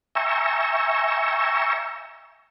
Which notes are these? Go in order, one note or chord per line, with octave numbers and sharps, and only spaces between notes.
E5 G5 G#5 A#5 C#6 E6